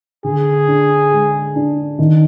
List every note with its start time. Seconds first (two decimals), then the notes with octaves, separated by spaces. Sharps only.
0.24 D3 G#4
0.68 D4
1.11 G#3
1.55 D4
1.99 D#3